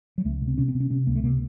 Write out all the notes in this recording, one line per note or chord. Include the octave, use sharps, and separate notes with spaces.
F#3
C#2 A3
C3
C4
C3 C#4
C4
C3
C#4
C3 C#4
C#2 A#3
A3
C3 A#3